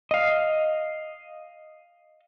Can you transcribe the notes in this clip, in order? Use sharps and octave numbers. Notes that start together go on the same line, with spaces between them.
D#5 F5